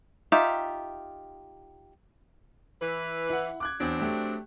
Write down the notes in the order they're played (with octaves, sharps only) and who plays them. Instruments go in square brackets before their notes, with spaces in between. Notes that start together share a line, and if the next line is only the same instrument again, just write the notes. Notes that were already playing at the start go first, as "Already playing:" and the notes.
[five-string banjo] D#4 F4 G4 E5
[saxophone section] E3 B4
[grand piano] E4 F#5
D6 F#6 G#6
[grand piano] E2 [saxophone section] F#3 C4 D4
[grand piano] A3 G4